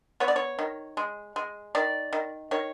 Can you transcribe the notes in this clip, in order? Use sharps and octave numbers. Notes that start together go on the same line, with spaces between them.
B3 C#5
D5
C#5
D#3
G#3
G#3
D#3 D5
D#3
D#3 C#5